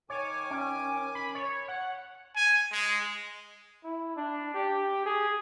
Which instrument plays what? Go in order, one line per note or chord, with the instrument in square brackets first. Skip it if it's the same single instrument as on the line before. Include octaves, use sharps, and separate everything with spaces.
[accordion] D#3 G#5 D6 [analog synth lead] C#5
[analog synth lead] C#4
B5
C#5
F#5
[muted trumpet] G#5
G#3
[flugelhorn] E4
D4
G4
G#4